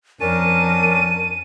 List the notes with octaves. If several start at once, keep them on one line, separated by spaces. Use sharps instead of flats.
F2 C#4 D4 A#4 A5 D#7